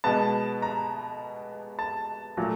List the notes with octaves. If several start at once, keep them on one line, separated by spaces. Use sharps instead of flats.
B2 G#3 B3 A5
A#5
A5
A#2 F#3 A3